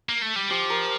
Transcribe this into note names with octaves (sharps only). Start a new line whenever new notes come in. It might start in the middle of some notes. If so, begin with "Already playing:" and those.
A#3
A3
G3
F3 G4
A#4